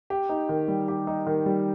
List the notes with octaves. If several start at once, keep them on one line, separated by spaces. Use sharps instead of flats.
G4
D#4
D#3
G3
G4
D#4
D#3
G3